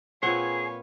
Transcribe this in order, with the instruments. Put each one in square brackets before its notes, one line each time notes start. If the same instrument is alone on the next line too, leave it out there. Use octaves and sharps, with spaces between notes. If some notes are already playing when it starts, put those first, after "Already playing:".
[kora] A#2 C4 F#5 [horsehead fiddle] F4 B4 [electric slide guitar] G#4 [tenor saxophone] C#5